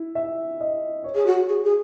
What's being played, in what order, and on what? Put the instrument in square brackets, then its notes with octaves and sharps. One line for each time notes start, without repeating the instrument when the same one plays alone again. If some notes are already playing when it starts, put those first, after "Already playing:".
Already playing: [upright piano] E4
E5
D#5
C#5
[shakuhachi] G#4
F#4
G#4
G#4